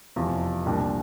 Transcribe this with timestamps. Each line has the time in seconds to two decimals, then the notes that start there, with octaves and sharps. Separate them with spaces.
0.16 F1 E2 C3 F3
0.66 C2 A#2 G3 D4